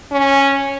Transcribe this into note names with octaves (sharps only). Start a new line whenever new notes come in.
C#4